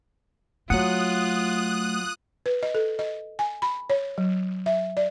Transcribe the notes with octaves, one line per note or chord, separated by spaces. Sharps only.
F#3 A3 F4 F#5 D#6 F#6
B4
D#5
A4
D#5
G#5
B5
C#5
F#3
E5
D5